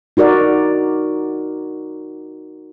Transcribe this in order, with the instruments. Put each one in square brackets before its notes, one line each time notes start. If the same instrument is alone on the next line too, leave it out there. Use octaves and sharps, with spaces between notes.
[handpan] D#4 F#4 A#4 D5